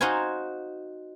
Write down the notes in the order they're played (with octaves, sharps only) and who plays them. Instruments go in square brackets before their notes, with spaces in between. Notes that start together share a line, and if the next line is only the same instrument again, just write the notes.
[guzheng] D#4 F#4 C5 F5 G#5